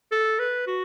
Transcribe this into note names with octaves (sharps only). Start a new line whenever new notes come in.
A4
B4
F#4